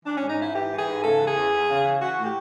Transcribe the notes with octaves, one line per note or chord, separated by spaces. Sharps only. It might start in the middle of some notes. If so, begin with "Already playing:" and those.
E3 D4
G#2 C#4
D#4
G#2 E4
E3 G4
E3
G#4
G#2
C#3 A4
E3
G#4
E2
E2
C#3
E3
E3 F#4
A2
G4